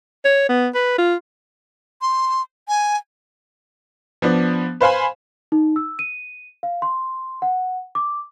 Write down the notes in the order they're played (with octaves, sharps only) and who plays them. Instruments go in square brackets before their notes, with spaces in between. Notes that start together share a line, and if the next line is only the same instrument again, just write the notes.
[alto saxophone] C#5
B3
B4
F4
[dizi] C6
G#5
[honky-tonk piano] F3 B3 D4
B4 C5 F5 G#5 B5
[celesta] D#4
E6
D#7
F5
C6
F#5
D6